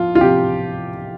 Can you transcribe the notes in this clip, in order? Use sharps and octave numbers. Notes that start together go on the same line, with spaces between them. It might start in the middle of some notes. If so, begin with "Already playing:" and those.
Already playing: F3 F4
F4
C3 F3 G4